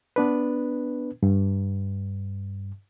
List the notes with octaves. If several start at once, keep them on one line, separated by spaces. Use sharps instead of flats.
B3 D4 B4
G2